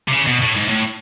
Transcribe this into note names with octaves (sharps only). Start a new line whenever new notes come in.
C3
C#3
B2
A2
G#2
A2